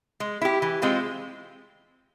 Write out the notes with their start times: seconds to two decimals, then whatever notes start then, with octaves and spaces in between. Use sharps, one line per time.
0.20 G#3
0.41 E4 G4
0.62 E3
0.82 G#3 C4 F4